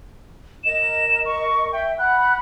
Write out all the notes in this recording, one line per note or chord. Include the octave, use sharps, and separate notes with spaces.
A#4 D#5 E7
C#6
E5 G5
F#5 B5 F#6